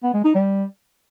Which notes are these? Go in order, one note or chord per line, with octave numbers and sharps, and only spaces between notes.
B3
G#3
D#4
G3